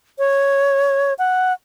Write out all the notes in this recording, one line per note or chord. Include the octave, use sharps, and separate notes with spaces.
C#5
F#5